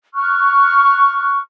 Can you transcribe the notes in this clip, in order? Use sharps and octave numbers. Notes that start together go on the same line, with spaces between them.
C#6 F6 F#6